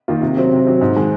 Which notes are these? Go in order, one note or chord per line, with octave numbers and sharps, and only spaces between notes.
D#3 A#3 F4
C3
F#3 C4
C3
F#3 C4
G#2
D#3 G#3